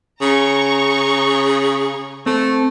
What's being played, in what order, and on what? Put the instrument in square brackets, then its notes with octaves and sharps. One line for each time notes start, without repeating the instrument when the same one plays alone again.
[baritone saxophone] C#3 [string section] A#5 C#6
[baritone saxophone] A3 [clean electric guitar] C4 A4